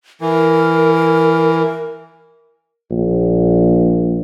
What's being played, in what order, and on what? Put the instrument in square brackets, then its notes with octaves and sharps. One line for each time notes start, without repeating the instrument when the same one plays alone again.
[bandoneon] E3 [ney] A#4
[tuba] A#1